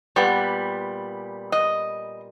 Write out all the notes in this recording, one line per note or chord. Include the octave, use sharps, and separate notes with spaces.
A#2 G3 B3
D#5